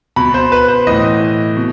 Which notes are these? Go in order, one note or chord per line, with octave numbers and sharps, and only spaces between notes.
B2 B5
C5
B4
C5
A2 E3 D#5
B2